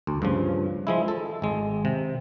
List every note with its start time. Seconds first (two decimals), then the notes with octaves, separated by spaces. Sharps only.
0.07 D2
0.22 G2 C#3 F3
0.87 F3 G#3 E4
1.08 A4
1.42 G#1 G#3
1.85 C3